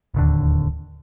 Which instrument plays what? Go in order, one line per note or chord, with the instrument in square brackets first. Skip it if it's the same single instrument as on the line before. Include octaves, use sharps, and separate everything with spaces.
[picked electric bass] D1 D#2 D3